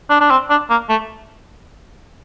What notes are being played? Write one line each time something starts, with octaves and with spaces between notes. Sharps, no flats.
D4
D4
C4
D4
A#3
A3